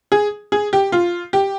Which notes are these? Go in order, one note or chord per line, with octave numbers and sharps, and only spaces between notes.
G#4
G#4
G4
F4
G4